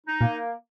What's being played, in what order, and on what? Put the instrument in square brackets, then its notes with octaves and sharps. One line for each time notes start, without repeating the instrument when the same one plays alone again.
[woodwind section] D#4
[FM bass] A#2 [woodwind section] A#3